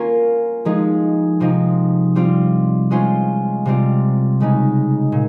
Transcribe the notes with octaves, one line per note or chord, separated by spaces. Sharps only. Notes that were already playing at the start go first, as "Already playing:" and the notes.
Already playing: A#3 C#4 F4 A#4
F3 G#3 D#4 G#4
C3 F3 C4 D#4
G3 C4 F4
G#3 C#4 F4 C5
C3 G3 C4 F4
C#3 G#3 D#4
A#2